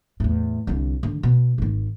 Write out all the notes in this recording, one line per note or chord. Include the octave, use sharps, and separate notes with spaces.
E2 A2
C2 D3
D3 D#3
B2
G#1 D#3